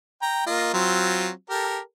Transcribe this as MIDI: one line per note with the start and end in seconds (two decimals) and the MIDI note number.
0.22 0.45 79
0.22 0.45 82
0.46 0.71 58
0.46 0.71 65
0.46 0.71 75
0.74 1.30 54
0.74 1.30 60
0.74 1.30 65
1.50 1.79 67
1.50 1.79 69
1.50 1.79 70